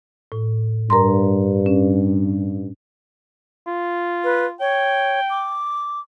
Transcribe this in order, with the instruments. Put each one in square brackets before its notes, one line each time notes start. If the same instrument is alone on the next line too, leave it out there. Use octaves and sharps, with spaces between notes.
[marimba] A2
[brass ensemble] G2 [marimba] A#4 A#5 C6
[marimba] C#4
[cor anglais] F4
[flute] B4
[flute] C#5 [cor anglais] G5
[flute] D6